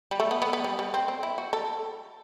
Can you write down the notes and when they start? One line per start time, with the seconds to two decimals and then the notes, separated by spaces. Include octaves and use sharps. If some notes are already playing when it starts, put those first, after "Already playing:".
0.11 G3
0.20 A3
0.31 B3
0.42 B3
0.53 B3
0.64 G3
0.79 G3
0.94 C4
1.08 C4
1.23 E4
1.38 F#4
1.53 A4